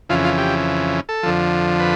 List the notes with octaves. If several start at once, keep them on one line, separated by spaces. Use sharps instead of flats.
F2 C#3 E3 F4
F4
G4
A4
F2 D3 F3
B4